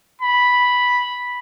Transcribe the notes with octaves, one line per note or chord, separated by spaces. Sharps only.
B5